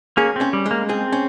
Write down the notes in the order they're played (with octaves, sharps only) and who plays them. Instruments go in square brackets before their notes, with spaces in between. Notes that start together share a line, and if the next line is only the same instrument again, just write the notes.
[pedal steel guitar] A#3 C#4 [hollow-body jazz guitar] G#4
[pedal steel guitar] C4
[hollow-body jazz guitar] C#4
[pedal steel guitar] G3
[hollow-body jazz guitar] G#3
[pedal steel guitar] A#3
[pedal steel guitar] C4 [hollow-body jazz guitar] G#4
[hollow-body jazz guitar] C#4